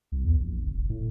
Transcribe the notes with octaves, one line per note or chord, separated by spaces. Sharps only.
C2
E2
A#1
G1
F1
A2